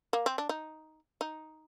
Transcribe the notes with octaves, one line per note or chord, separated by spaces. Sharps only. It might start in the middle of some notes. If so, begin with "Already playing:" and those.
A#3
C4
D4
D#4
D#4